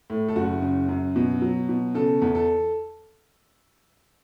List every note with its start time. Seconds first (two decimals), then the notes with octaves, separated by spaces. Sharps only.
0.10 A2
0.28 A4
0.36 F#1 F#4
0.62 C#3
0.89 F#2
1.16 B2
1.42 F#3
1.69 B2
1.95 C#3 A4
2.22 E2
2.35 A4